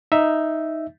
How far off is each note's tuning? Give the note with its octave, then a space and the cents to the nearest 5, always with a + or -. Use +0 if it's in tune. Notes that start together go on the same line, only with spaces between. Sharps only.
D#4 +0 E5 +0